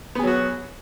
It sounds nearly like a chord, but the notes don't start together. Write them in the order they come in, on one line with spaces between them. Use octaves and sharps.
B3 G#4 F#3 F#4